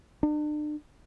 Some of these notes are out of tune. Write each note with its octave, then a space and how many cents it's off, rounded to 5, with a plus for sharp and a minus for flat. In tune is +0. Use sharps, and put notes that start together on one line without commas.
D4 +40